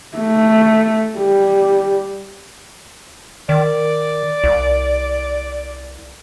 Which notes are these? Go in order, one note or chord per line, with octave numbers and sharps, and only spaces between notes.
A3
G3
D#3 D5
C2